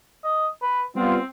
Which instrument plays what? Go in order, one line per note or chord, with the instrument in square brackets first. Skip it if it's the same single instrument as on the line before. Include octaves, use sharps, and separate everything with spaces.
[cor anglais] D#5
B4
[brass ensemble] G3 B3 F4 [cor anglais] C4